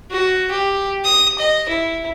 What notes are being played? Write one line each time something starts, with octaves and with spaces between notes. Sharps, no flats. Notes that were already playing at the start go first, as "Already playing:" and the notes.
F#4
G4
D#6
D#5
E4